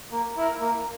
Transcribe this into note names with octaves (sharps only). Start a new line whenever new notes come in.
A#3
E4 A#4
A#3